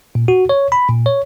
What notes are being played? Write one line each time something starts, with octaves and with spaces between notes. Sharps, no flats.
A#2
F#4
C#5
B5
A#2
C#5